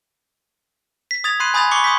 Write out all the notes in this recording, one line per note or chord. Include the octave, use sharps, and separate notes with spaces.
B6
D#6 G#6 A6 F7
B5 C6 F#6 C7 D#7
G#5 B5 D#6 G6 A6 F7
B5 C#6 D6 C7 C#7 G7
C6 D#6 G6 B6